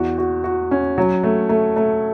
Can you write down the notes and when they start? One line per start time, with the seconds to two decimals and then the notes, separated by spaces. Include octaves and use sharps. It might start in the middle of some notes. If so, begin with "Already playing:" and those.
Already playing: E2 F#4
0.18 F#4
0.44 F#4
0.71 C#4
0.98 F#3
1.24 A3
1.49 A3
1.76 A3